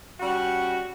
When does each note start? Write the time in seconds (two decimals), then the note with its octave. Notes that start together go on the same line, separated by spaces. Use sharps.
0.20 G3 C#4 F#4